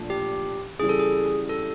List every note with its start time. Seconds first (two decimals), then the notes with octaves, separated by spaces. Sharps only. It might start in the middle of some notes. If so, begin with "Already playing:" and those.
Already playing: A#2 F3 A3 D4
0.10 G4
0.80 C#3 E3 G3 G#4
0.89 A4
1.00 G#4
1.49 A4